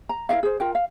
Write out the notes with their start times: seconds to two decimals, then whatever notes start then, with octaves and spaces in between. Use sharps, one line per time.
0.09 A#5
0.29 E4 A#4 E5 F5
0.43 G#4 C5
0.60 F4 A#4 G5
0.75 F5